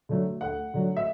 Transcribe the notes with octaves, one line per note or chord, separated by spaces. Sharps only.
D3 F#3 A3
D2 F#5
D3 F#3 A3
E5